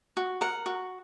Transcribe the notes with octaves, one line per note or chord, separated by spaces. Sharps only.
F#4
A#4 F#5
F#4